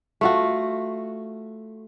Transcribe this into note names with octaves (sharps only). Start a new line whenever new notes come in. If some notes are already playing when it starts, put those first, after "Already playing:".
A3 F4 F#4